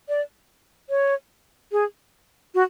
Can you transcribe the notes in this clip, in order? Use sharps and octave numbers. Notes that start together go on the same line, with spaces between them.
D5
C#5
G#4
F#4